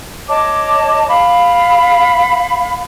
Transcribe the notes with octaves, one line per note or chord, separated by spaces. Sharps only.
C#5 D#5 A5 D6
F5 B5